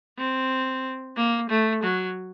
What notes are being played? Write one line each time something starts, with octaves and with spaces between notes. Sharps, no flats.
C4
A#3
A3
F#3